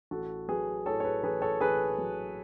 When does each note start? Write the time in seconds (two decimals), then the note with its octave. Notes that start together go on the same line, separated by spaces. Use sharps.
0.11 A1 F#4 A4
0.48 F#3 G#4 B4
0.86 A2 A4 C#5
1.00 C#5
1.04 G#4 B4
1.23 A1 G#4 B4
1.42 A4 C#5
1.61 A1 G#4 B4
1.98 F#3